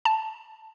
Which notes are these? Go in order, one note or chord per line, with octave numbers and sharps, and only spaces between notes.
A5